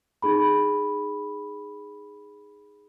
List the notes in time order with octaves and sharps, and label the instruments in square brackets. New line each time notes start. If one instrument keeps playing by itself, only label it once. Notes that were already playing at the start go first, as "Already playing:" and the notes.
[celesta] D#4 G#4 B5